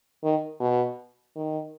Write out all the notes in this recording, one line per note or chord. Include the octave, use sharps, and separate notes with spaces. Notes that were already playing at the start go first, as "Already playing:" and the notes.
D#3
B2
D#3